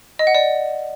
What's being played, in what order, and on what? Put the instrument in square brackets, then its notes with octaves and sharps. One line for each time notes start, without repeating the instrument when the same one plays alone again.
[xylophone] D#5
F#5
D5